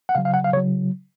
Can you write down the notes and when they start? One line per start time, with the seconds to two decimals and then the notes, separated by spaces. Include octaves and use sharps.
0.09 F#5
0.15 C#3 F#3 F5
0.25 F5
0.34 F#5
0.44 F5
0.53 C#3 C#5
0.57 F#3